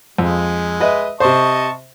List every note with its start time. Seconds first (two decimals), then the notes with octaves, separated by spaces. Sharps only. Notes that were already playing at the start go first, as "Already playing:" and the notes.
0.19 F2 G#3
0.80 B4 D#5 E5
1.20 C3 C5 D#5 A5 C#6